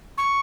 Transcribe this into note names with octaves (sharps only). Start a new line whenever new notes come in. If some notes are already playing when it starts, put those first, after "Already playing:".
C#6